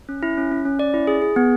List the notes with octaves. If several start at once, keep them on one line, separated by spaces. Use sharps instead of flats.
C#4
E4
C#4
C#4
C#4
C#4 D5
E4
G#4
G#4
B3